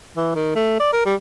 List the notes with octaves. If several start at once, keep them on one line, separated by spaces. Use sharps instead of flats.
E3
D#3
A3
D5
A#4
G3